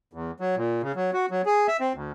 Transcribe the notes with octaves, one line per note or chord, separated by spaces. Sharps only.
E2
F#3
A#2
C#3
F#3
F#4
F#3
G#4
E5
C4
D2